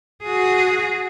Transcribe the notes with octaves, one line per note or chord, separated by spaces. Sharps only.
F#4 G#4